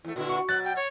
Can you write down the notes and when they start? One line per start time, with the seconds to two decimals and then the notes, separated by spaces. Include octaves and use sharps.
0.05 E2 A3 E4
0.16 A#2 D3 E4 F#4
0.30 C#6
0.49 B2 F#3 F#6 A6
0.65 G5
0.76 C#5